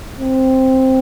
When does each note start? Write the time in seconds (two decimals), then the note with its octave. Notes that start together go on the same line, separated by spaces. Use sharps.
0.21 C4